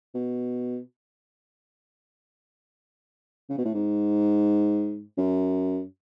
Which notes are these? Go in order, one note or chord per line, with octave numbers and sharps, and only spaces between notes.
B2
C#3
B2
A2
G#2
F#2